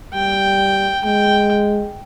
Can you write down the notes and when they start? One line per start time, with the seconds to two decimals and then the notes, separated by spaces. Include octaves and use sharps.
0.13 G3 G5
1.04 G#3 G5